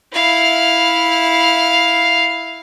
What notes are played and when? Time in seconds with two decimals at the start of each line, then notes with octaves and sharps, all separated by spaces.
0.13 E4 F5